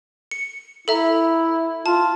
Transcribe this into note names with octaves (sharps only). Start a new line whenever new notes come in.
C#7
E4 A4 E5 A#5
F4 A5